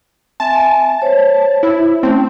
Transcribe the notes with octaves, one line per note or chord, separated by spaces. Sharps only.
C4 E5 G#5 A5
C5 C#5
E4
A3 C4 C#4